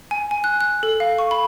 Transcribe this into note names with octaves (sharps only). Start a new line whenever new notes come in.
G#5
G#5
F#6
F#6
A4
F5
C#6
B5